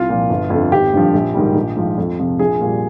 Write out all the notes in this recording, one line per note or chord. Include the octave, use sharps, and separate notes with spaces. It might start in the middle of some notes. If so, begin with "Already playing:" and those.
Already playing: C2 F4
A#2 F3
G1
F2 D3
G#1 G4
G2 D3 F3
A#1
G#2 D#3 G3
A#1
G#2 F3
F2
C3 F3
A#1 G#4
A#2 G3